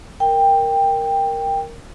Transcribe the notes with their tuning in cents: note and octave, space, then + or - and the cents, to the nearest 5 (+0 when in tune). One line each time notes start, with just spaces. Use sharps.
A#4 +0 G5 +10